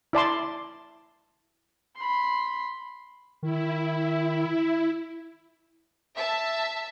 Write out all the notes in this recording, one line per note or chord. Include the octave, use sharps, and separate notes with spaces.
E4 D5 A5 C6
B5 C6
D#3 E4
E5 A5